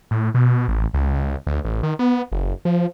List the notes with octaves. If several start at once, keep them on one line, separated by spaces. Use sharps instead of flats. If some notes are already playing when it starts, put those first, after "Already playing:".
A2
B2
A1
C#2
C#2
D2
A1
D#3
B3
F#1
F3